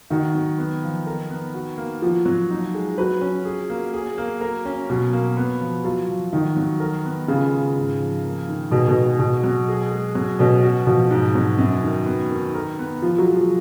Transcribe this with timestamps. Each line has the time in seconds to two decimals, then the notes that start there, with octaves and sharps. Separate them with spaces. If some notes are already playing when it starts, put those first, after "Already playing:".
0.10 D#3 F#4
0.35 F#3
0.58 B3
0.83 F3
1.07 A#4
1.30 B3
1.54 F#4
1.78 A#3
2.02 F3 F#4
2.26 F#3
2.51 D#4
2.75 G#3
2.98 F#3 B4
3.21 C#4
3.45 G#4
3.70 A#3
3.93 G#4
4.18 A#3
4.41 A#4
4.65 C#4
4.90 B2 F#3
5.13 A#3
5.37 B3
5.61 F3
5.84 F#3 F4
6.09 F3
6.33 D#3 F#4
6.57 F#3
6.80 A#4
7.05 B3
7.28 C#3 F4
7.52 G#3
7.77 G#2
8.00 F3
8.24 A#3
8.48 D#3
8.71 B2 G#4
8.88 B2
8.96 G#3
9.19 B2 F#4
9.44 F#3
9.68 G#4
9.91 G#3
10.15 F#3
10.39 B2 C#4
10.63 F#4
10.87 B2 F3
11.10 G#2
11.35 F#3
11.58 F#2
11.83 D#3
12.06 B3
12.30 D#3
12.54 A#4
12.79 B3
13.02 F3 F4
13.18 F#3
13.26 G#3
13.34 F3